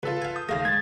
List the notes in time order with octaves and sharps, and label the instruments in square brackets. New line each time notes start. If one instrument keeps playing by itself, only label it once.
[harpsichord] C#2 C#3 [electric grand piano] F4 A4 B4
[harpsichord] F5 G#5
[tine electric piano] D#6 [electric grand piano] G6
[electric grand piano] D#2 F5 A#6 [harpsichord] C#3 A3
[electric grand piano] G#3 [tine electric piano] G#6 A6